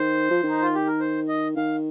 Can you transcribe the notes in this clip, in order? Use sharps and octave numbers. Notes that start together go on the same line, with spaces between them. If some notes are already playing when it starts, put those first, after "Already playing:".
Already playing: D#3 C5
F3
D#3
D#4
F4
G4
A#4
C5
D#5
D#3 F5